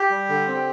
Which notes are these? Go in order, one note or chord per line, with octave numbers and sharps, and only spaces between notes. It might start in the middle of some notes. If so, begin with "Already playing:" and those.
Already playing: G4
G3
D3
C4